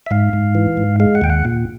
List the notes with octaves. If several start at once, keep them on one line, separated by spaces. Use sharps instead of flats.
E5
G#2 F5
G#2
E3
G#2
G#3 F5
F#5
D#2 G5
F#5
A#2